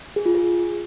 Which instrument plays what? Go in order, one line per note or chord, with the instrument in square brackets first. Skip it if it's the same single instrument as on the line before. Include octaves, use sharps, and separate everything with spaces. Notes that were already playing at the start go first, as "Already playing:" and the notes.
[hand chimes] G#4
F4
G#4